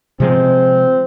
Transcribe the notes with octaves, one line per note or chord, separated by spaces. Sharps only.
C3 F3 G#3 C4